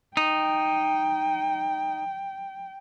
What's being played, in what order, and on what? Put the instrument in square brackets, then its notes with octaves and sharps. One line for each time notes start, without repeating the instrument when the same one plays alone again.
[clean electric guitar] D#4 [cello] G5